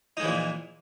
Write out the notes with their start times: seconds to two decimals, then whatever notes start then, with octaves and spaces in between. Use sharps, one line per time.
0.17 D#4
0.20 G#3
0.22 E3
0.25 F3
0.28 A#2